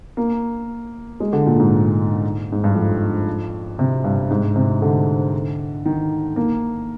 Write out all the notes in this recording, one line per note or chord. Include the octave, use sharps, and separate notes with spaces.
A#3
G#3
D3
A#2
G#2
G#2
G2
F2
C3
G2
G#2
C3
D3
D#3
A#3